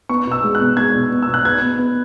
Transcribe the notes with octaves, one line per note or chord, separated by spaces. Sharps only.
B3 C#6
B2 E6
G#3
F#6
B2
G#3 G#6
B2
B3
E6
B2 F#6
B3 G#6
B3
B3